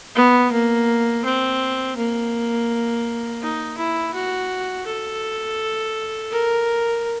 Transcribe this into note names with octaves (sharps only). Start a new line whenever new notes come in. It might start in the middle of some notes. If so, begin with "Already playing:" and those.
B3
A#3
C4
A#3
D#4
E4
F#4
A4
A#4